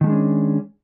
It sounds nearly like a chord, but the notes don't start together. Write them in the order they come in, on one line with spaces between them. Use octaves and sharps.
D#3 A3 G#3 D4 C#4